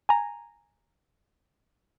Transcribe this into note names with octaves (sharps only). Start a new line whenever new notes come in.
G#5 A#5